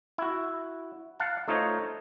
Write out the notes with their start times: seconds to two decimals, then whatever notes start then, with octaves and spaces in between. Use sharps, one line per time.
0.18 E4 F#4
1.20 F5 F#5 A5
1.48 A3 D#4 F4 C5 C#5 D#5